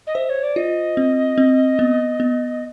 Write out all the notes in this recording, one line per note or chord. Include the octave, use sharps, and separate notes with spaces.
D#5
C5 E5
C#5
D5
F4 D#5
C4
C4
B3
B3